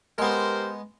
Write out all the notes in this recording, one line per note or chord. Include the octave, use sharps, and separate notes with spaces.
G#3 B3 G4 A#4 C5